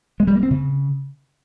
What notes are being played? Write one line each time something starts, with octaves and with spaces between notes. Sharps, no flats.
G#3
G3
A#3
C4
C#3